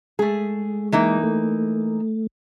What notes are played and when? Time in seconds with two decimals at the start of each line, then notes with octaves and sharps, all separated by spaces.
0.19 G#3 A3 G#4
0.92 E3 A#3 D#4
1.24 A3